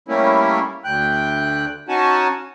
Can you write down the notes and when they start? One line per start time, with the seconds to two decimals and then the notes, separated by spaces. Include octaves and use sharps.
0.08 G3 A3 A#3 C#4 E4
0.85 D2 G5 F#6
1.89 C#4 D#4 F#4 F#5 G#5 A5